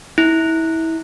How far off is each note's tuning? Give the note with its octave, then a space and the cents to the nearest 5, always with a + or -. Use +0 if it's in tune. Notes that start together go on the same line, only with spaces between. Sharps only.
E4 -25